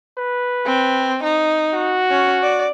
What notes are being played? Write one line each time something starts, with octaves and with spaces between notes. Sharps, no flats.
B4
C4
D#4
F#4
C#4
D5